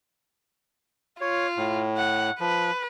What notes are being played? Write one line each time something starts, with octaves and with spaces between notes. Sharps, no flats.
F4 C#5
A2
F#5
F3 B4